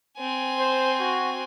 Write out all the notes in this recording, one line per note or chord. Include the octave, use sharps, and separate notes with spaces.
C4 G#5
C5
F#4